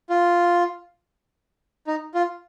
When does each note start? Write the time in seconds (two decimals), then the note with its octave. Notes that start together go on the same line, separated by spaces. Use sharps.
0.10 F4
1.87 D#4
2.15 F4